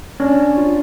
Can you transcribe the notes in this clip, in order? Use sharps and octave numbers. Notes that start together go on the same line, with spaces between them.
C#4 D4
F4